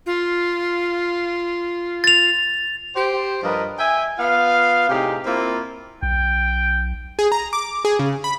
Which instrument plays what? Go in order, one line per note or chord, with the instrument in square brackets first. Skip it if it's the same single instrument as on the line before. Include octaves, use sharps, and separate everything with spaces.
[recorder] F4
[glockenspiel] A6 F7
[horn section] G4 C5
G2 F3 A#4 B4 D#5
E5 G5 G#5
B3 F4 F5
A2 C3 D#4 G4 G#4
A#3 C4 E4 F4 A#4
[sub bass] B1 [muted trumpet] G5
[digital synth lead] G#4
A#5
D6
G#4
C#3
B5